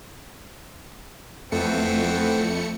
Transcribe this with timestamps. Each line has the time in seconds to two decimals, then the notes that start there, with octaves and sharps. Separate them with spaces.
1.52 F2 E3 A3 B3 C4 C#7